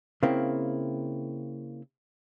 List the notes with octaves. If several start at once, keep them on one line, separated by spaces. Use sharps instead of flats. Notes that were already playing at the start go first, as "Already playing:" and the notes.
C#3 A#3 C4 E4